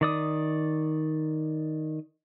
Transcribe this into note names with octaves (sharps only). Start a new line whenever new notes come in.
D#3 D5 D#6